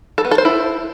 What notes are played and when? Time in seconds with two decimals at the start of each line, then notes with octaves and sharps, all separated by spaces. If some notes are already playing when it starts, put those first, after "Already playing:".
0.18 A4
0.25 B3
0.31 A4
0.38 C5
0.45 E4